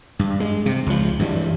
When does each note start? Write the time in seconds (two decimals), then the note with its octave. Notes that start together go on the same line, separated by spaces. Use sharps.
0.19 G2
0.40 G#3
0.66 C3
0.86 C#2 F3
1.19 G2 E3 F#3 G3